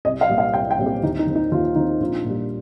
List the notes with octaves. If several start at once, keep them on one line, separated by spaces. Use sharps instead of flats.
C2 D#5
F5
A#2 G3 C4
F5
C2 G5
G5
A#2 G3 C4
G4
D#2 D#4
D#4
D#3 C4
D#4
D#2 F4
D#3 C4 D#4
A#1 F4
A#2
G3